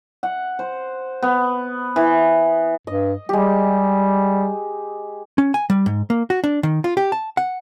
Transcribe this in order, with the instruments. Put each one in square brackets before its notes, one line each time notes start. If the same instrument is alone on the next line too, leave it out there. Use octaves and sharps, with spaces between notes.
[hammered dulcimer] F#5
C5
B3
E3
[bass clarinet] G2 [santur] D#5
[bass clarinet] G3 [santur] G#3 G4
[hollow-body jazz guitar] C#4
G#5
G3
G#2
A#3
F#4
D4
D#3
F4
G4
A5
F#5